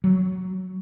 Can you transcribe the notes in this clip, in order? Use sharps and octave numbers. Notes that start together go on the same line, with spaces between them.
F#3